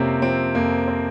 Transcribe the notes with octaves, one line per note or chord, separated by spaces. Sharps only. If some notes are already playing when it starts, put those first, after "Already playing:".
Already playing: F2 C3 A#3 C4 C#4
F3 C4
F2 A#3
C4